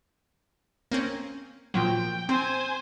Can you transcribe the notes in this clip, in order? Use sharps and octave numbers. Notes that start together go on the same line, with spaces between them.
A#3 C4 C#4
A#2 F3 F#3 G5
C4 C5 G#5